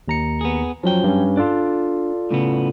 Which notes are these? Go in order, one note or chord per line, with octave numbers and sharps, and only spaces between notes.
D#2 A#5 C#7
B3 G#4
F#2 F3 F#3 G5
G2 C#4
D4 F4 A4 D5
A2 C#3 B3